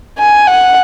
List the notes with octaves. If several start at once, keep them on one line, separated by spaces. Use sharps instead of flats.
G#5
F#5